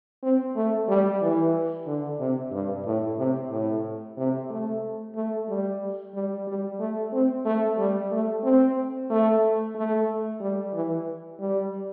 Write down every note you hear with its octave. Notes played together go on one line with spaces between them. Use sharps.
C4
A3
G3
E3
D3
C3
G2
A2
C3
A2
C3
A3
A3
G3
G3
G3
A3
C4
A3
G3
A3
C4
A3
A3
G3
E3
G3